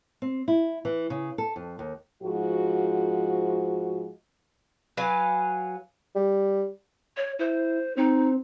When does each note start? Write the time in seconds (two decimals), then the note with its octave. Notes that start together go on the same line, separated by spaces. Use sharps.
0.22 C4
0.48 E4
0.85 E3
1.10 C#3
1.38 A4
1.56 F2
1.79 D#2
2.23 G#2 F3 F#4
4.97 F#3 B4 F5 G#5
6.15 G3
7.17 C#5
7.39 E4 C5
7.97 C4 D#4